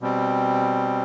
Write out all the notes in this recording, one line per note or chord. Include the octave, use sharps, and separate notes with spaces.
B2 G3 C4